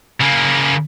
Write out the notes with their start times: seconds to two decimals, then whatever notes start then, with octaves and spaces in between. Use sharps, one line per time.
0.21 C#3 A#3